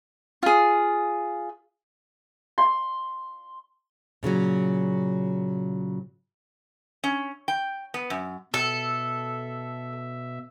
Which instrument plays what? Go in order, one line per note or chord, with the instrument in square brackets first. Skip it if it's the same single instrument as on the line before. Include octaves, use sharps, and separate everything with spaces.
[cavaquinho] F4 G#4
[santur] C6
[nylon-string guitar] A#2 C#3 E3 F#3
[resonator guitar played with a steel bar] C#4
G5
B3
F#2
[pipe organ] B2 E5 [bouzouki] A4